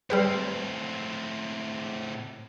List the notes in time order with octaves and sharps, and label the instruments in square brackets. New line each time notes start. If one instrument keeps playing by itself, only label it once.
[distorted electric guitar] A2 C4 [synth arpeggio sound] G3 G4 B4